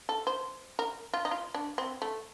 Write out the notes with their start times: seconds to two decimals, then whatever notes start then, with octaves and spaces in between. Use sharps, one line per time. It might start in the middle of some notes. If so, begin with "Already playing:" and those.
0.09 A4
0.27 C5
0.79 A#4
1.14 F4
1.25 D#4
1.31 F4
1.55 D4
1.78 C4
2.02 A3